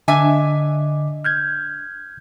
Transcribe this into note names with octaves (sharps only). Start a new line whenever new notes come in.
D3 D4 D#5 E5 G#5 D6
F6 G6 G#6